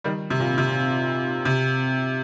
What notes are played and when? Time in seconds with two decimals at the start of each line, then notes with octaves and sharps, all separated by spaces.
0.04 D#3 G3
0.30 C3
0.40 A#2
0.58 C3
1.45 C3